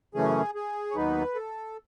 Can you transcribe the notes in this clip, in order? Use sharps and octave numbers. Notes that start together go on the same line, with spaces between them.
F#2 C#3 E3 A3 C#4 G#4
G#4
C#5
D#2 D#3 F#3 B3 D#4 B4
A4